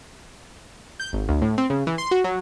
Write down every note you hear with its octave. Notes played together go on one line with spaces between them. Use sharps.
G6
G#1
D2
A2
C4
C#3
E3
C6
F#4
F#3